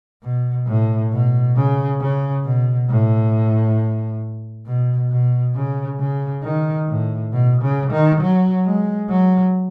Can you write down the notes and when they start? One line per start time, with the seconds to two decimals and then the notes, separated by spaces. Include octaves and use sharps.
0.23 B2
0.67 A2
1.12 B2
1.56 C#3
2.00 C#3
2.45 B2
2.89 A2
4.66 B2
5.10 B2
5.55 C#3
5.99 C#3
6.43 D#3
6.87 A2
7.32 B2
7.62 C#3
7.91 D#3
8.21 F#3
8.65 G#3
9.09 F#3